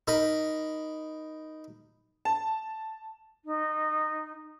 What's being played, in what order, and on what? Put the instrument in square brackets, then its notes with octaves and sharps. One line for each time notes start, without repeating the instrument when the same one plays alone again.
[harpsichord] D#4 A#4 B5
[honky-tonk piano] A5
[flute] D#4